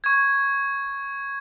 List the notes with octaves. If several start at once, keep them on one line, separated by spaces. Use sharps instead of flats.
C#6 G#6